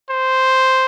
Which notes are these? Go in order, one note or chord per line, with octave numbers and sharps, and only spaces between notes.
C5